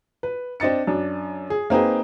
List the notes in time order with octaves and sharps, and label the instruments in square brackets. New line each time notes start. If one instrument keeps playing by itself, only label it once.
[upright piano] B4
C4 D4 D#5 A6 C#7
F#2 D4
G#4
A#3 C4 D#4 G#4 B4